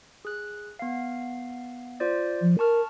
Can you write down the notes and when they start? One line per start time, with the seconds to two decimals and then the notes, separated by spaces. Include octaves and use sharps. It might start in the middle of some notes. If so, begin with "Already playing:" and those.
0.25 G#4 F#6
0.79 B3 F5
2.00 F4 C5 D5
2.42 F3
2.59 A#4 A5 C#6 F6